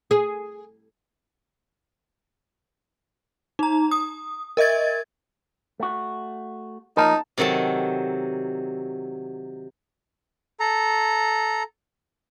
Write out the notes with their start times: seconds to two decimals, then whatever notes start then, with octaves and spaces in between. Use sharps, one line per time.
0.11 G#4
3.59 D#4 A#5
3.91 D#6
4.57 A#4 D#5 E5 G#6 A6
5.80 A3 F#4
6.97 F3 A#3 D#4 A#4 A5
7.38 C3 D#3 F#3 A4 A5
10.60 A4 A#5